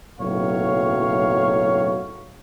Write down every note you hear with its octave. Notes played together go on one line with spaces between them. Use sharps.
F#1 B1 A2 F#3 C#5 F5